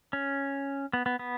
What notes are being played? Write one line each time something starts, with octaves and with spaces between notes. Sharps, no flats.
C#4
B3
B3
B3